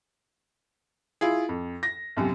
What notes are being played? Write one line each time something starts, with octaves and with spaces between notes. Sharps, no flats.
E4 F4 G#4
F2
A#6
B1 F#2 C3